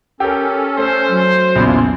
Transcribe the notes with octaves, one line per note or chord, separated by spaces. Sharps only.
C#4 G4 A4 A#4
A3 C5
F#3
A#1 E2 C#3 D4 E4 F4